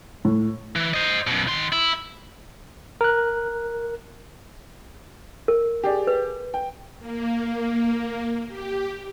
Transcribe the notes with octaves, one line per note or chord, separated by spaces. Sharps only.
A2
E3
C5 D#5
F#2 B2
D#3 C6
E4
A#4 F#6
A#4
G4 G#4 D5
B4
G5
A#3
G4